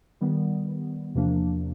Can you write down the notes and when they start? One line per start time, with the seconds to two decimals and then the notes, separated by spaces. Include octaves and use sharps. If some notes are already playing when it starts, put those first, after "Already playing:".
0.21 D#3 G3 B3
1.15 E2 C3 F3 A#3 D4